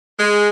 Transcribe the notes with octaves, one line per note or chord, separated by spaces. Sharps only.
G#3